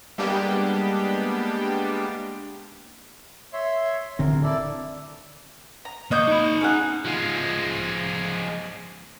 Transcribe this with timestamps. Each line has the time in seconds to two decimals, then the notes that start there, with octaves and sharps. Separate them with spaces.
0.18 G3 G#3 A#3 B3 D4 G4
3.53 C#5 E5 C6
4.19 D1 D3 C4 A#4
4.43 E4 A4 D5
5.85 A#5
6.11 A#3 C#5 D#5 G6
6.28 D#4 B5
6.61 C#4 G#4 F#5
7.05 F3 G#3